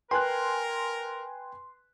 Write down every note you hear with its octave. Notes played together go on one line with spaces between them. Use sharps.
A#4 B4 G5 G#5 C6 F#6